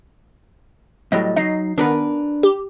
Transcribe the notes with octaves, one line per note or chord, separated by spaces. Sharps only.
A2 F#3 G3 D#5
F#3 D#4 D#5 C7
D#3 B3 D4 A#4 B4
G4